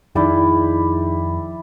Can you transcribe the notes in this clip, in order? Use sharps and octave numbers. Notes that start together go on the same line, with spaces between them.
F2 D#3 D#4 E4 G#4 D5 G5